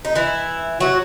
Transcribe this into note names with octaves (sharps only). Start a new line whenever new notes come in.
D#4
E3 E4
F#3 F#4